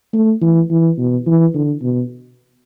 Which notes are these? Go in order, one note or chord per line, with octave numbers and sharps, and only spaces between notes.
A3
E3
E3
B2
E3
D3
B2